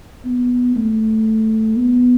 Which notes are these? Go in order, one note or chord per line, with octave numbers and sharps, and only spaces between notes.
B3
A3
B3